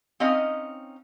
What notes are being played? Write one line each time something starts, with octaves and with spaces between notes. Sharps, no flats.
C4 C#4 D#4 D#5 F5